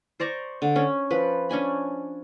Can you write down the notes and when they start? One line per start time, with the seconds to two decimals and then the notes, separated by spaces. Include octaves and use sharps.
0.20 C5 D5 A#5 C#6
0.62 D3
0.76 C#4
1.11 F3 B4
1.49 C#4 D4 G#5 B5